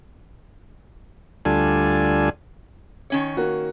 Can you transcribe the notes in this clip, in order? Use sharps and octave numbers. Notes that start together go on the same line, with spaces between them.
D2 G3 D4 F4 A4 G#5
D#3 C#4 C#5
A#3 F#4